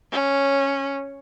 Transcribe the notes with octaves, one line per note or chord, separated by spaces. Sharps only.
C#4